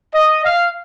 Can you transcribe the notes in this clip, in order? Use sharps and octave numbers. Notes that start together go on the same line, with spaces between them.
D#5
F5